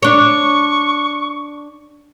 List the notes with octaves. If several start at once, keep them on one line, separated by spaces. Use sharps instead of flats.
D4 C#5 C#6